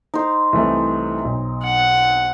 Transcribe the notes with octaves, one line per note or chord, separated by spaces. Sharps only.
D#4 C5
C2 E3 A3
B1
F#5